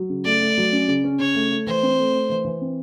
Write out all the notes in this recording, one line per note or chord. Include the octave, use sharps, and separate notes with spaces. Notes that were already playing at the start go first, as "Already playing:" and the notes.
Already playing: F#3
C#3
A3 D5
A3
F#3
C#4
C#3
C#4
C#3 C#5
A3
A3
E3 C5
C4
A3
A3
E3
E3
C4